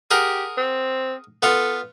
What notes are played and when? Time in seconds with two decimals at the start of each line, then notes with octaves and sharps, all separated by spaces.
0.11 G4 G#4 A#4 F#5
0.57 C4
1.43 B3 F4 A4